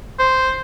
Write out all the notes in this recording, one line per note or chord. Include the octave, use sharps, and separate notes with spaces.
C5